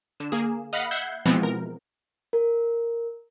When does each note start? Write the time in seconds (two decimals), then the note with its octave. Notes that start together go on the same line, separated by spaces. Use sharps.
0.20 D3 E7
0.32 A#3 G#4
0.73 D#5 F5 F#5 B5
0.91 E5 F#5 G6 G#6 C7
1.26 B2 E3 F3 G#3 B3 C4
1.43 A#4
2.33 A#4